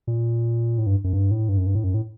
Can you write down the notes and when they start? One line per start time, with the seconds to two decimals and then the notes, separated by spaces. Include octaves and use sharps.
0.07 A#2
0.78 A2
0.87 G2
1.04 F#2
1.13 G2
1.31 A2
1.49 G2
1.57 F#2
1.66 G2
1.75 A2
1.84 F#2
1.94 A2